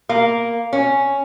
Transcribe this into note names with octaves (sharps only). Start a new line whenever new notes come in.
A#3
C#4